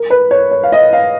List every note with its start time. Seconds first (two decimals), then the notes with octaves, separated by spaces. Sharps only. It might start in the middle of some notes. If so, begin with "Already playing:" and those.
Already playing: A#4
0.10 B4
0.31 C#5
0.51 C#5
0.63 F5
0.72 D#5
0.93 F5